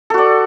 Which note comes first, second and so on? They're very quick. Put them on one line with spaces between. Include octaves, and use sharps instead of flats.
A4 F#4 D5